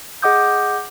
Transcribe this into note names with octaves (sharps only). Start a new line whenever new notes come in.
G#4 D#5 F#5 D6 D#6 G6